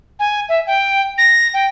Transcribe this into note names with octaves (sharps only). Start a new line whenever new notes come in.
G#5
E5
G5
A#6
G5